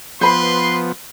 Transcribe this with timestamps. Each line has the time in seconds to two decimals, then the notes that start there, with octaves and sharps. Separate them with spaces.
0.21 F3 B3 B4 C5 B5 C6